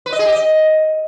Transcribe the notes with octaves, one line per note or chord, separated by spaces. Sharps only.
B4
D#5
G#4
G4
D#5